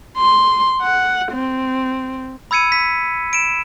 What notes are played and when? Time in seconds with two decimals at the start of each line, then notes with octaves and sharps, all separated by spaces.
0.17 C6
0.82 F#5
1.32 C4
2.51 B5 E6 G#6 C#7 D#7
2.72 B6
3.33 D7 E7